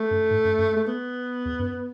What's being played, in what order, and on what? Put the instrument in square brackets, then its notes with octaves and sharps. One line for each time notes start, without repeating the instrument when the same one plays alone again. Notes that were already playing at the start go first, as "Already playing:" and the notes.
Already playing: [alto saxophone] A3
[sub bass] F#2
G#2
F#2
F#2
[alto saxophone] A3
B3
[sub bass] E2
F#2